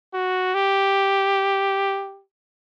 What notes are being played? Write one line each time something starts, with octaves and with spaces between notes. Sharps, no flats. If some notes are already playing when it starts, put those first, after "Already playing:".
F#4
G4